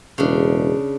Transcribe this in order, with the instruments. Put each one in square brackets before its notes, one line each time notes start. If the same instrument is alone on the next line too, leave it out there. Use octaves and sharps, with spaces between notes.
[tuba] E1 [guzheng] C#3 D4